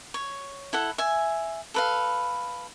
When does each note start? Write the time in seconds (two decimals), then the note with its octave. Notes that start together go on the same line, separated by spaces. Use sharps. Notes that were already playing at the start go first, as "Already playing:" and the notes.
0.14 C#5
0.73 E4 A4 F#5
0.98 E5 G#5
1.74 A4 B4 F5